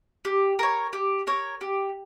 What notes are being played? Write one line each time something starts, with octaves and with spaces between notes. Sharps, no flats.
G4
A#4 C#5
G4
A#4 C#5
G4